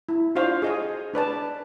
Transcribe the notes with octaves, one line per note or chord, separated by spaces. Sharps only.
E4
D4 F4 F#4 C5 F5
G#4 D#5 G#5
D4 B4 D5 A5